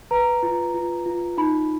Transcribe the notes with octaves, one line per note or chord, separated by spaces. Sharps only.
B4 A#5
F4
F4
F4
D#4 B5